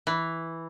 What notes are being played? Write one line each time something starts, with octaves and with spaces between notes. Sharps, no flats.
E3